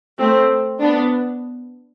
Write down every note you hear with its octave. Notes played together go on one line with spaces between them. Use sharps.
A3 C4
B3 D4